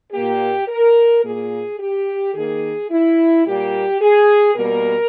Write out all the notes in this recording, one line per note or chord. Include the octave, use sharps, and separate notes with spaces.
A#2 A#3 G4
A#4
A#2 A#3 G#4
G4
D#3 A#3 G#4
E4
A#2 G3 A#3 G4
G#4
B2 G3 A#3 A#4